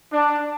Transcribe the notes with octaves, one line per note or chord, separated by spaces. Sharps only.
D4